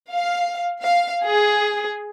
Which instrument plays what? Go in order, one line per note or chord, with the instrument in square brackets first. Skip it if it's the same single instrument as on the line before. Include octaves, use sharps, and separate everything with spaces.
[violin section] F5
F5
G#4